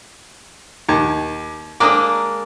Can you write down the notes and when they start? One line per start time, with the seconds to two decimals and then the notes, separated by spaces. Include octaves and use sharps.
0.89 D#2
1.80 G#3 A#3 D4 D6 D#6